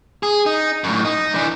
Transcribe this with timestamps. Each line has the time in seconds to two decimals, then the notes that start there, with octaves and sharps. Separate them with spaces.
0.23 G#4
0.46 D#4
0.84 F#2 A2
1.05 D#4
1.34 E3 D4